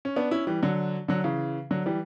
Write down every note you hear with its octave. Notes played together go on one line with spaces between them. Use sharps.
C#4
B3 D4
C#4 E4
E3 G3
D3 F#3
D3 F#3
C#3 E3
D3 F#3
E3 G3